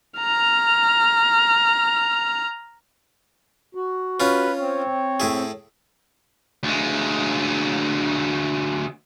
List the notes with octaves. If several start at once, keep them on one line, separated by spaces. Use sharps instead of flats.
A#5 F6
F#4
C#4 F4 B4
C4 C#5
A2 E4 G#4
D2 G#3